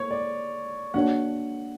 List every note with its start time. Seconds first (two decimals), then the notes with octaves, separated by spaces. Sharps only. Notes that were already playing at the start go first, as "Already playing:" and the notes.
Already playing: A#3 E4 A#4 C#5
0.11 D5
0.94 A#3 D4 F#4 C#5 F#5